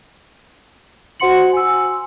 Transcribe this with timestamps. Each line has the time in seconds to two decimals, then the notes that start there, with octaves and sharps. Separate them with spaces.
1.20 F#4 C5 F#5 C6 C#7 F#7
1.53 G#5 E6